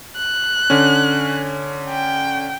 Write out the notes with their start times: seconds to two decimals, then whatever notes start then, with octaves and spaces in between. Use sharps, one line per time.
0.17 F#6
0.70 D3 C#4
1.90 G5